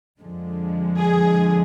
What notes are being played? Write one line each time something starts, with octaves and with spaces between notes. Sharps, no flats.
F2 D3 F3 G#3
G#4